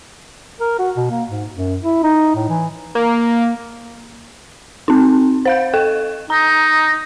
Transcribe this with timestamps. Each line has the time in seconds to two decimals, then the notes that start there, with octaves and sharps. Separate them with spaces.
0.60 A#4
0.79 F#4
0.97 B2
1.10 A#3
1.29 G#2
1.55 F#2
1.82 E4
2.03 D#4
2.36 A2
2.49 E3
2.95 A#3
4.88 C4 D#4
5.45 C5 F5 G6
5.74 A4 G5
6.30 D#4 A#5